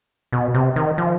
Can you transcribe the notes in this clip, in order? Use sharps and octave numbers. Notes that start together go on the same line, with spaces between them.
B2
C3
D#3
F3